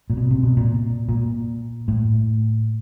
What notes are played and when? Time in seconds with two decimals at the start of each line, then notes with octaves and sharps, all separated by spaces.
0.10 A#2
0.17 B2
0.31 C3
0.43 B2
0.57 A#2
1.09 A#2
1.88 A2